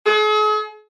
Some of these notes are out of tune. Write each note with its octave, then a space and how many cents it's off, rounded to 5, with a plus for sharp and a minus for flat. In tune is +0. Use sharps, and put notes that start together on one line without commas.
G#4 +45